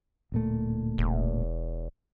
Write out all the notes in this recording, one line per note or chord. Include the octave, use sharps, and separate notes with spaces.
D1 A#2 A3
E1